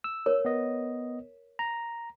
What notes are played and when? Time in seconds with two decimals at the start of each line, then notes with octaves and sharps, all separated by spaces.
0.04 E6
0.26 A#4 C#5
0.45 B3 D#5
1.59 A#5